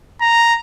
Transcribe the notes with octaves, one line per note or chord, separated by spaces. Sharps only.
A#5